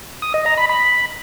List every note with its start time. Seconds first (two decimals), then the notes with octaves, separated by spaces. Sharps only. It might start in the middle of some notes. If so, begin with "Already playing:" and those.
0.22 D#6
0.34 D#5
0.46 A#5
0.58 B5
0.69 B5